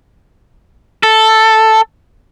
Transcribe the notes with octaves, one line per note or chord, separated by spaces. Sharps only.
A4